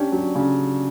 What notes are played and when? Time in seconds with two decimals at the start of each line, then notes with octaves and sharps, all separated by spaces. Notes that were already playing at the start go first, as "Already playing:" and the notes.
Already playing: C#4 D4 G4
0.12 F#3
0.35 C#3